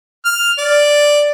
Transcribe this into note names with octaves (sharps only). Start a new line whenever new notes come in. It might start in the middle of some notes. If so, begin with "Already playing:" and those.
F6
D5